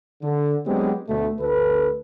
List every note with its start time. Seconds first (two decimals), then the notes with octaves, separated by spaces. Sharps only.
0.23 D3
0.66 F#3 G#3 B3 C4 D4 G4
1.08 D2 B2 A3
1.40 D2 A4 B4